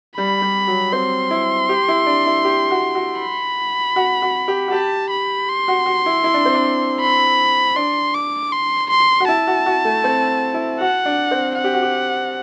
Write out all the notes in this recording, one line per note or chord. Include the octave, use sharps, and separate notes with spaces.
G3 B5
G3
F#3
C4 C6
E4
G4
E4
D4
E4
G4
F#4
F#4
B5
F#4
F#4
G4
F#4
G4 A5
B5
C6
F#4
F#4
E4
E4
D4
C4
D4
B5
D4 C6
D6
C6
C6
F#4
E4 A5
F#4
F#4
A3
C4
E4
F#4 F#5
D4
C4
F#5
G4
F#4
G4